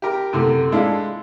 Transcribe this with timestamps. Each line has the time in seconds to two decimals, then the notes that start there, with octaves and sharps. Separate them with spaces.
0.02 G4 A#4
0.33 F#2 C3 E3 A3
0.72 G#3 A3 D4 E4 F4 A4